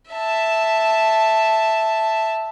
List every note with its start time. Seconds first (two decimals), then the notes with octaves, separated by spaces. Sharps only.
0.11 E5 A5